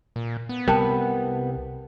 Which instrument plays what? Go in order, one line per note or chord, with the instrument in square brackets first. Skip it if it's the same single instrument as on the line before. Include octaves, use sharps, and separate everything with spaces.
[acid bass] A#2
B3
[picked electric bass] C2 C3 G3 [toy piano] A#4 G5 A5